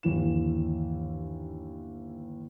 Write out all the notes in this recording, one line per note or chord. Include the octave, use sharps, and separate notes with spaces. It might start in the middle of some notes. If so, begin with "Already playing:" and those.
G1 D#2 E3 E4 E7